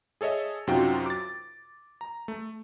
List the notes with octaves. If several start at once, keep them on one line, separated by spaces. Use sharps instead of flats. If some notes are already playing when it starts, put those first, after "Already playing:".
G#4 A4 C#5 D#5 E5
F#2 C3 D#4 F4 F#4 G5
D6 A6
A#5
A3